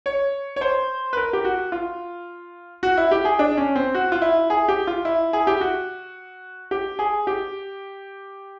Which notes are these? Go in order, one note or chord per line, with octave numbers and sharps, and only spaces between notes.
C#5
C#5
C5
B4
A#4
G4
F#4
F4
F#4
E4
G4
G#4
D4
C#4
C4
F#4
F4
E4
G#4
G4
F4
E4
G#4
G4
F#4
G4
G#4
G4